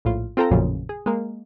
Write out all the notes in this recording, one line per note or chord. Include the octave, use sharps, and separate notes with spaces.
A#1 A2 F4
C4 F4 A4 G5 A#5
A1 F2 A#2 C#3 F3 F#3
G#4
G#3 A#3